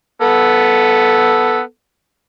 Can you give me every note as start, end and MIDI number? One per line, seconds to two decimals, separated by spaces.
0.22 1.61 59
0.22 1.61 69